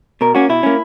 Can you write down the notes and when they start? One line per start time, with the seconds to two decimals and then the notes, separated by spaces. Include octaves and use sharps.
0.21 B2 A#4
0.35 A#3 C#4 F#4
0.49 B2 E4
0.63 A#3 C#4